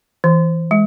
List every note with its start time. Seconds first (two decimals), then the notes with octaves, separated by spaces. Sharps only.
0.24 E3
0.71 G#3